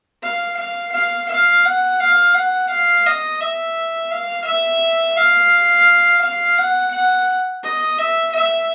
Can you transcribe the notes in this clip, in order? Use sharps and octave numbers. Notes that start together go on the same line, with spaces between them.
F5
F5
F5
F5
F#5
F5
F#5
F5
D#5
E5
F5
E5
F5
F5
F#5
F#5
D#5
E5
E5